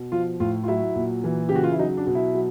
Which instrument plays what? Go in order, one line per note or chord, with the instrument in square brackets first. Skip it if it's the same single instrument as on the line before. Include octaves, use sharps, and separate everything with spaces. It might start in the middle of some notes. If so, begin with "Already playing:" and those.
Already playing: [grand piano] B2
F3 F4
A2 F4
F4
F#3 E4
A#2
E3
C#3 G4
F#4
F4
E4
F#3 D#4
D4
B2
E4
F#3